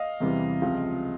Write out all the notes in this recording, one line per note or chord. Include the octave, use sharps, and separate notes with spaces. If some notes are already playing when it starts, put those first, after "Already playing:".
Already playing: D#5 F5
E2 C3 E3 G3
C#2 C3 F3